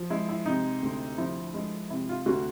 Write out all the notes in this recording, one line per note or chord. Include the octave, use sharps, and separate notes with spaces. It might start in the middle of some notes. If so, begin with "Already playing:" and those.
Already playing: F3
G#3 E4
E4
C3 D#4
D2
F3 E4
G#3
C3 E4
F4
D2 F#4